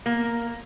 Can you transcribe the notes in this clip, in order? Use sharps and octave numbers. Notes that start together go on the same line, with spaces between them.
A#3